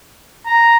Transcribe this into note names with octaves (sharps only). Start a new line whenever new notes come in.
A#5